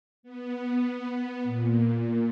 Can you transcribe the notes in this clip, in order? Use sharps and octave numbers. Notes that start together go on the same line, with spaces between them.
B3
A#2